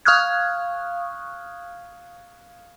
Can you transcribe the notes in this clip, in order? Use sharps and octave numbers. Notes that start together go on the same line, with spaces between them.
F5 C#6 D#6 F6 F#6 G#6